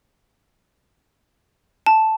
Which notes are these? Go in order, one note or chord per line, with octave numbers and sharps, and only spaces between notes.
A5